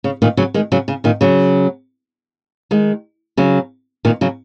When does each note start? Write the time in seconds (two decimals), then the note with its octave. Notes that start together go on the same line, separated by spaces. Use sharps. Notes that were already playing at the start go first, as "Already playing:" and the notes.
0.04 C#3
0.22 A#2 D#3
0.37 C#3 F#3
0.54 D#3 G#3
0.72 C#3 F#3
0.88 C#3
1.04 A#2 D#3
1.21 C#3 F#3
2.71 D#3 G#3
3.37 C#3 F#3
4.05 A#2 D#3
4.21 C#3 F#3